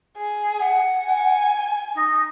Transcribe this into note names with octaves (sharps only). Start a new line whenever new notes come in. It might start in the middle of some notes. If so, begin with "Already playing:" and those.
G#4
F#5
G#5
D#4